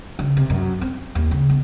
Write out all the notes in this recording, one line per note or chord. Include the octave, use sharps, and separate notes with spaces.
C#3
C3
F#2
C4
D#2
C#3
B3